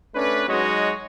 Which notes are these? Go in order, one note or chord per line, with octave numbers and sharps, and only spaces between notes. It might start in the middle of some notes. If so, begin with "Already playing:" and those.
A3 C#4 D4 B4
F#3 G#3 D#4 F#4 C#5 D#5